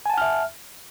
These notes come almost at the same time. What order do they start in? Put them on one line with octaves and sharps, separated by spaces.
G#5 A5 F#5 F6 E5